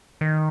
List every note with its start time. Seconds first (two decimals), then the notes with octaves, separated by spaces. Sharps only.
0.21 D#3